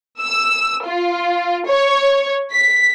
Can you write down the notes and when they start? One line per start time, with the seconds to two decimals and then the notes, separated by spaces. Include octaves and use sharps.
0.20 E6
0.86 F4
1.67 C#5
2.52 B6